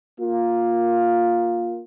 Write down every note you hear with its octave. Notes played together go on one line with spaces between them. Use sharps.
A#3 F4